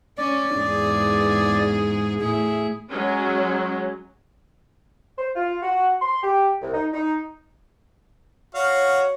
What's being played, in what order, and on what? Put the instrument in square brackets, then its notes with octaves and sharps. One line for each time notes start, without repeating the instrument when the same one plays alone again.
[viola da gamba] C#4 [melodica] D5
[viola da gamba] E2 G#2 G#4
[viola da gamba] A2 E4 [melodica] G#4
[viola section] F#3 G#3 C#4
[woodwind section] C5
F4
F#4
C6
G4
C2
D#4
D#4
[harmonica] F#4 F5 [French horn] C#5